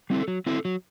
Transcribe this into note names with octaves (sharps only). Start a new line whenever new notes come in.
G3 C4 E4 A4
F#3
C4 E4 A4
F#3